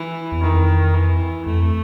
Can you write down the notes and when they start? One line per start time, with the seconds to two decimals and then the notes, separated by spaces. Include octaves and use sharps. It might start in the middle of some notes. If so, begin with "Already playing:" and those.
Already playing: E3
0.32 E2
0.40 F2 D#3
0.94 E3
1.46 F2 A3